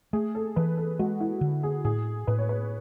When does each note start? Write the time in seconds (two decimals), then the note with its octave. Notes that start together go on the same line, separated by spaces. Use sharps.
0.13 A3 G#4
0.35 A4
0.56 E3 B4
0.77 A4
0.99 G#3 F#4
1.20 E4
1.41 D3
1.63 G#4
1.85 A2 G#4
2.27 A2 B4
2.38 C#5
2.49 B4